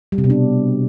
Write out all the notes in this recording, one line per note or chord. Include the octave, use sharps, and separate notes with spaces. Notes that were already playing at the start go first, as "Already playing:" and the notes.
G3
C3
B2
D4